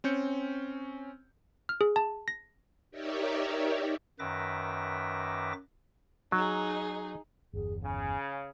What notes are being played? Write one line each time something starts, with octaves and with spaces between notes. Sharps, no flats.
C4 C#4 G6 C#7
F6
G#4
A5
A#6
D#4 G4 A#4 C#5 D5 E5
F#2 D#3 B4 E5 D6 A#6
F#3 D#4 G#4
G1 E2 G#4
C#3 G#5